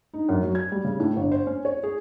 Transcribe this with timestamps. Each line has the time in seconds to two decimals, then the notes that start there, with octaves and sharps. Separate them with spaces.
0.14 D#4
0.29 F#2
0.42 F#3
0.55 G#6
0.72 G3
0.84 C#3
1.00 A2
1.16 G1
1.32 C5
1.47 C#4
1.65 C#5
1.83 G#4